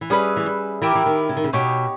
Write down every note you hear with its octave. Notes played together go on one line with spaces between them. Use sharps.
E3
G3 C#4 G#4 B4 E5
E3
G3
E3 E4 G4 A#4
E3
D#3
C#3
D#3
C#3
B2 D#4 G4 C#5